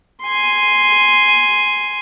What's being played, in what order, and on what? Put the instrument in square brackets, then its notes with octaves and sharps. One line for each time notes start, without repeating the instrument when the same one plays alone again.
[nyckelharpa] G#5 C6